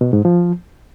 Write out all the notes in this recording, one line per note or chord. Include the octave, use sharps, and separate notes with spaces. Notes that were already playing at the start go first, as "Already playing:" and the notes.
B2
G#2
F3